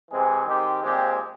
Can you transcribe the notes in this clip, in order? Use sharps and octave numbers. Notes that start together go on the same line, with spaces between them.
C3 E3 G#3 C4 G#4
D#3 G#3 C4 G4
A#2 F3 G#3 C4 G4